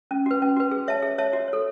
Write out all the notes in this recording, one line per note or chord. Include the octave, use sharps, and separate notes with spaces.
C#4
F#4 B4
C#4
F#4 B4
G#4
C#5 E5 A5
G#4
C#5 E5 A5
F#4
A4 C#5